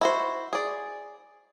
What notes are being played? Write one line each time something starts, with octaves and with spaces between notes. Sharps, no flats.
E4 F#4 C5
G#4 D5